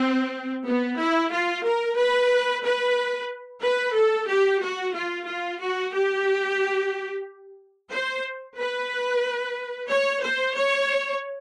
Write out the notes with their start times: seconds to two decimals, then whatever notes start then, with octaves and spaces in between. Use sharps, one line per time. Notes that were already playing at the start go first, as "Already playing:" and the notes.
Already playing: C4
0.66 B3
0.99 E4
1.33 F4
1.65 A#4
1.98 B4
2.64 B4
3.63 B4
3.96 A4
4.28 G4
4.62 F#4
4.95 F4
5.27 F4
5.61 F#4
5.93 G4
7.91 C5
8.58 B4
9.89 C#5
10.22 C5
10.55 C#5